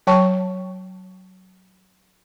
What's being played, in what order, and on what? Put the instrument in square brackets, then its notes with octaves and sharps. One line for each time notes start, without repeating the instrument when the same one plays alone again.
[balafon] F#3 C#5 G5 A5 C#6